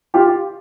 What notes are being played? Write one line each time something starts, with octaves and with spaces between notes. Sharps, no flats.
F4 G4